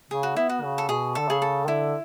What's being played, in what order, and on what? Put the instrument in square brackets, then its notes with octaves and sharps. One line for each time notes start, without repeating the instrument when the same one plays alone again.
[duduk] C#3 [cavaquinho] G#4
[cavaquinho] F#4
[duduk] B3 [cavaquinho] E4
[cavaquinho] F#4
[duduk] C#3
[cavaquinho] A4
[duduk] B2 [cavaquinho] G#4
[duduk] D3 [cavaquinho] A4
[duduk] C#3 [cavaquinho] G#4
[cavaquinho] A4
[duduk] D3 [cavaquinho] E4